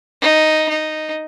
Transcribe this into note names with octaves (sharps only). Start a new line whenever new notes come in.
D#4
D#4